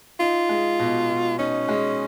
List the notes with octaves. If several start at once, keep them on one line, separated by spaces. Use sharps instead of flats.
D#4 F4
G#3
B2
B2
C#4 D#4
G#3